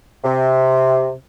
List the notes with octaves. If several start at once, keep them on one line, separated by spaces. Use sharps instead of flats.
C3